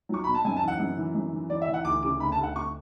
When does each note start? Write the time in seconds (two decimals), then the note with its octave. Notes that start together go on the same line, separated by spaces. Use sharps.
0.09 F#3 C#6
0.24 B2 B5
0.35 A5
0.45 F#2 G#5
0.57 A5
0.63 E3
0.68 F#5
0.79 F#2
0.98 E3
1.15 F#2
1.33 E3
1.50 E3 D5
1.62 E5
1.68 E3
1.74 F#5
1.85 D2 D6
2.03 C#3 D6
2.20 D2 B5
2.32 A5
2.38 D2
2.43 F#5
2.55 D2 C#6